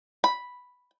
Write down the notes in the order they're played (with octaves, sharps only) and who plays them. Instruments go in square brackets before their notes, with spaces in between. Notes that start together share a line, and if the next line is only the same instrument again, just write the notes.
[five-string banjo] B5